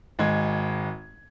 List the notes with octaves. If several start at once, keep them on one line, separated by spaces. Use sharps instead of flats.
G#1 G#3 G#6